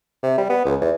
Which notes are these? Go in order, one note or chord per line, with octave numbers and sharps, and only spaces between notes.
C3
G3
B3
C#2
E2